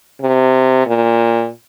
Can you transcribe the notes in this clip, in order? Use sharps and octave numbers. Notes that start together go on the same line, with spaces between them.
C3
A#2